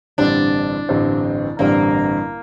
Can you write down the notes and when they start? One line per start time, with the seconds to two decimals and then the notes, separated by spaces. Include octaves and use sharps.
0.18 A1 G2 D3 G3 C4 D4
0.89 A1 G2 D3 G3 C4
1.59 A1 G2 D3 G3 A#3 C4